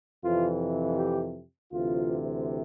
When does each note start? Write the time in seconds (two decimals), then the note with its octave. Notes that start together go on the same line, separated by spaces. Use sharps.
0.24 F2 C3 E3 F4
0.98 G4
1.72 D2 C3 E3 F4